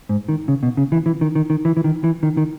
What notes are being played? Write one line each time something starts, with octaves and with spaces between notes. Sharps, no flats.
G#2
D#3
C#3
B2
C#3
E3
E3
D#3
D#3
D#3
E3
E3
D#3
E3
D#3
D#3